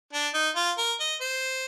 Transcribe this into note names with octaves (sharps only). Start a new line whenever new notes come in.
D4
D#4
F4
A#4
D#5
C5